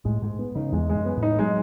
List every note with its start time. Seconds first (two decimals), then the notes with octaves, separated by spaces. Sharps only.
0.05 A2 G#3
0.22 G#2 G#3
0.39 B3
0.55 C#3 D#4
0.72 E2 G#3
0.90 G#3
0.95 F#2
1.05 B3
1.17 A2
1.23 D#4
1.39 F#3 G#3